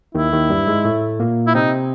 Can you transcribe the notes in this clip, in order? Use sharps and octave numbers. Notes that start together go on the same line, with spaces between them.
D#2 D#3 E4
D#2 D#3
G2 G3
G#2 G#3
A2 A3
A#2 A#3
E4
C3 C4 D#4